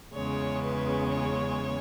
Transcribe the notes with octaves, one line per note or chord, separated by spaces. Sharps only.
E2 C#3 G#3 C#4 C#5
B4
C#5